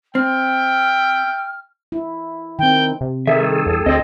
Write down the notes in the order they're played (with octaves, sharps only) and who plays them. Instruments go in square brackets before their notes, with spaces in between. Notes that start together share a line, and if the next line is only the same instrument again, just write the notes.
[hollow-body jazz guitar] C4 [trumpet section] E5 G5 [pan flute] F6
[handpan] E4
[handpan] D#3 C4 [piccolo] G5
[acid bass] C3
[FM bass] D#3 [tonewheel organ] G#4 A4 [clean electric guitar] E5
[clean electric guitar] G2
[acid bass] E2
[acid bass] D2 [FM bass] C4 [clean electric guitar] D#5